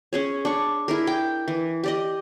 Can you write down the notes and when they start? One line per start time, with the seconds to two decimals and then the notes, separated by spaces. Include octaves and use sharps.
0.13 C#4 G#4 C#5
0.45 D4 C#6
0.88 E4 G#4 A#4
1.07 G5 D6
1.48 E3
1.84 G4 D5 D#5